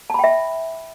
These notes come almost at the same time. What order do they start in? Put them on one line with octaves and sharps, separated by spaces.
A5 B5 G5 E5